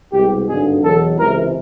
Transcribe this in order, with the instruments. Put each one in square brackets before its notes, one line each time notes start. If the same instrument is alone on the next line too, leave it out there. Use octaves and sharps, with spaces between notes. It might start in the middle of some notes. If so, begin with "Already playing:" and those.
[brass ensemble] C2 B2 G#3 G4
G#1 G2 D3 F#3 G#4
E2 B2 F#3 A4
C#2 C3 E3 G#3 A#4